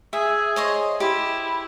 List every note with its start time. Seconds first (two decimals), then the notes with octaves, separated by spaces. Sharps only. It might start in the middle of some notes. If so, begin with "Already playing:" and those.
0.13 G#4 E5
0.56 C5 C#5 D#5
1.00 E4 G4 C5